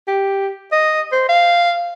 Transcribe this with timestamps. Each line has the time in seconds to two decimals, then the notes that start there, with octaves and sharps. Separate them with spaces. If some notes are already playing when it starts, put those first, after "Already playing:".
0.08 G4
0.72 D#5
1.12 C5
1.29 F5